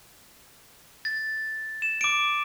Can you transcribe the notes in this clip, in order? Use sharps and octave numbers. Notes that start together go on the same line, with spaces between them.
A6
E7
D6 D7